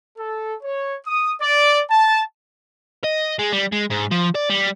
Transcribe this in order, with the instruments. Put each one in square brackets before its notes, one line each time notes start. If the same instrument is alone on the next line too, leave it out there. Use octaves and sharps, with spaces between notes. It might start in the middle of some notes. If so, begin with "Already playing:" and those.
[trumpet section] A4
C#5
D#6
D5
A5
[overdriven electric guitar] D#5
G#3
G3
G#3
G#2
F3
D5
G3